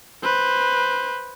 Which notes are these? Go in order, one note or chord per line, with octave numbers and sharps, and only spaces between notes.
B4 C5